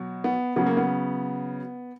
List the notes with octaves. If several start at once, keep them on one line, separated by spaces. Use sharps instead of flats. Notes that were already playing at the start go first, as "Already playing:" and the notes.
Already playing: B2 F#3
B3
C#3 F#3 B3
A#3
B3